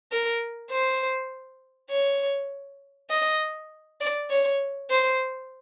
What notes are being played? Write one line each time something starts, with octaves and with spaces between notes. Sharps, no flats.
A#4
C5
C#5
D#5
D5
C#5
C5